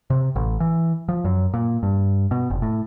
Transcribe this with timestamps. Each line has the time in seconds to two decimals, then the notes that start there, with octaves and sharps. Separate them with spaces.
0.10 C3
0.36 A1
0.60 E3
1.09 F3
1.25 F#2
1.54 A#2
1.83 G2
2.31 B2
2.50 F1
2.62 A2